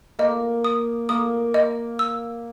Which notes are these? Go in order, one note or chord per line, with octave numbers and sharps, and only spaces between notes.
A#3 D#5
D#6
A#3 D#6
D#5
E6